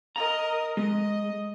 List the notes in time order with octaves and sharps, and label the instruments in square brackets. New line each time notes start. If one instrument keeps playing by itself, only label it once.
[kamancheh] A#4 D#5 [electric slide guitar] A#5
[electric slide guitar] G#3 [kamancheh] D#5